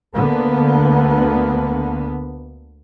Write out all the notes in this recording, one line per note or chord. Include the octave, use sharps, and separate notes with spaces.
D2 D3 A#3 B3